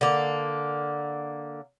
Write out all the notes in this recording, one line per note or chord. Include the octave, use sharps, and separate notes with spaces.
D3 A#3